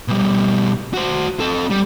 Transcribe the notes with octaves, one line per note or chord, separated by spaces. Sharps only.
B2 G3
F#4 C5
C4 A4
G3